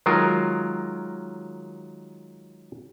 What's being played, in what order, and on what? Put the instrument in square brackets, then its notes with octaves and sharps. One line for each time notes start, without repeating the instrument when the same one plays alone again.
[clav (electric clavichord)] D#3 F#3 G#3 F4 A#4